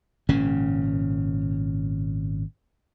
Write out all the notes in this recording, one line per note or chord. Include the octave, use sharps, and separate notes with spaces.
G#1 A#2 C#3 C#4